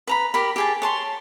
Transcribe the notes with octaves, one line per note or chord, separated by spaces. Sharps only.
B4 A#5 B5
G4 A#4 B5
G4 G#4 A5
C#5 A5 C6